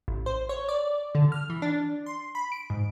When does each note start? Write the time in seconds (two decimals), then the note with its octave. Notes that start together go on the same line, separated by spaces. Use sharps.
0.08 A1
0.26 C5
0.49 C#5
0.68 D5
1.15 D3
1.32 F6
1.50 E3
1.62 D4
2.06 C6
2.35 B5
2.52 D7
2.70 G#2